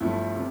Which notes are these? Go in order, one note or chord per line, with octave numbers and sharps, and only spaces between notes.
G1 G2 F3 A3 E4
C3